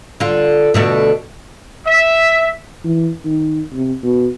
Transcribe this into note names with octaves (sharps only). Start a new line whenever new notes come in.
D3 F4
B2 D3 A3
E5
E3
D#3
C3
B2